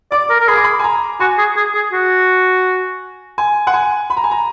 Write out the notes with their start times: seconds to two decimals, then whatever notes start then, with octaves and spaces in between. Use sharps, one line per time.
0.11 D5 D6
0.30 A#4
0.40 A#4
0.48 G#4 B5
0.56 D6
0.64 B5
0.79 G#5
0.84 A#5
1.20 F#4 G#5
1.38 G#4
1.57 G#4
1.75 G#4
1.93 F#4
3.38 G#5
3.67 F#5
3.74 G#5
4.10 B5
4.17 A#5
4.24 G#5
4.31 A#5